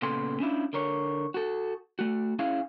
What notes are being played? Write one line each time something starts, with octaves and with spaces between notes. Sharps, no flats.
A#2 C#3 B3 A4 G#5 C6
C#4 D4 E4 F4
D3 A#4 C#5
F#4 A4
A3 F#4
C#4 E4 G#4 F5